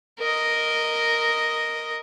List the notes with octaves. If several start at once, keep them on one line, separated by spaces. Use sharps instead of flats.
A#4 D#5